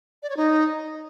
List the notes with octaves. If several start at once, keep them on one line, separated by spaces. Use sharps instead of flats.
D5
C#5
D#4